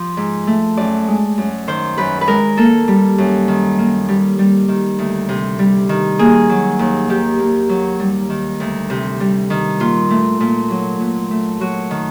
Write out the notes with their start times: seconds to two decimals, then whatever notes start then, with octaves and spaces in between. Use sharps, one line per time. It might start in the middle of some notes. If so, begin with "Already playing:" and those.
Already playing: F3
0.17 G#2
0.47 A3
0.77 F#2 D5
1.07 G#3
1.38 F#2
1.68 D#3 C5
1.98 F#2 B4
2.21 B4
2.28 G#3 A#4
2.57 A#3 A4
2.88 G3
3.18 F#2
3.48 D#3
3.78 A#3
4.08 G3
4.39 G3
4.68 D#3
4.98 D2
5.29 C3
5.59 G3
5.89 D#3
6.19 A#3 G#4
6.50 F#3
6.79 D#2
7.09 D#3 G4
7.40 A#3
7.69 F#3
8.00 G3
8.30 D#3
8.60 D2
8.90 C3
9.20 G3
9.50 D#3
9.80 A#2 F4
10.10 A3
10.40 A#2
10.71 F#3
11.01 A#2
11.31 A3
11.60 F#3 F#4
11.91 D#3